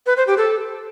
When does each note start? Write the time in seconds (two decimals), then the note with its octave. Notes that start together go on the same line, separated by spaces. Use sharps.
0.06 B4
0.17 C5
0.27 G4
0.37 A4